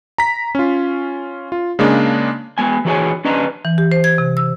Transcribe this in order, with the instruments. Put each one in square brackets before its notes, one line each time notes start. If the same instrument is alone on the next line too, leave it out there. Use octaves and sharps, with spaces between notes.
[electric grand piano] A#5 B6
C#4 F4
F4
C#3 G#3 A#3 D4
[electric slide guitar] G#3 B3 G#5
E3 A3 F#4 G#4 C#5 G#5
C#4 D4 B4 D#5 A#5
[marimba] E3
G4
C5
G#6
C3
E6